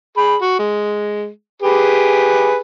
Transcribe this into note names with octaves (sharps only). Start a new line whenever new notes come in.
G#4 B5
F#4
G#3
G4 G#4 B4